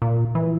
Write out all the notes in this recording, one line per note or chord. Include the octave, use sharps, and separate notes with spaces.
A#2
E3